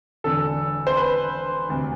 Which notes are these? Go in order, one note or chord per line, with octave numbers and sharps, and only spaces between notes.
E1 E2 D3 A4
C5
B4
E1 D2 C3